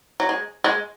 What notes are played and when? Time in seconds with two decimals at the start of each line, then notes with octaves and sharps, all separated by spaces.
0.20 F#3
0.29 G#3
0.64 G#3